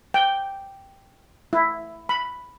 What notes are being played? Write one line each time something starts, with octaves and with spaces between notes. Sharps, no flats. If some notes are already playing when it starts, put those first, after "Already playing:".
G5
E4
B5